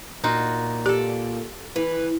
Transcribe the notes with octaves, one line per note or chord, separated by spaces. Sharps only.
A#2 D#4 F4 F#4
G4 A4 D5
E3 B4